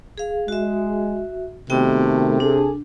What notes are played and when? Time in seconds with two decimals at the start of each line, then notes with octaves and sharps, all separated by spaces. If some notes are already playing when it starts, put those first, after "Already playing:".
0.18 G#4 F5
0.48 G#3 F#4 E5
1.70 C3 D#3 A3 B3 F#4 G5
2.40 D4 G#4 A4